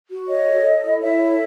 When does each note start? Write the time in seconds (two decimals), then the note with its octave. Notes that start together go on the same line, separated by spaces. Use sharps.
0.11 F#4
0.28 C#5 D#5
0.46 A4
0.65 A4
0.83 E4
1.01 E4 C#5 E5
1.20 A4